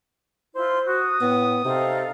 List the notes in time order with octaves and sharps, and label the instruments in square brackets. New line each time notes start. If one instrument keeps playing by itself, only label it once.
[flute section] E4 F4 C6 [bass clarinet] C5
[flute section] F#4 [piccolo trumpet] D#6
[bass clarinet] A2 [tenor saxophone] B3 [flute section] G5
[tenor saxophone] C3 [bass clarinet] C4 [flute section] D#4 A4 F5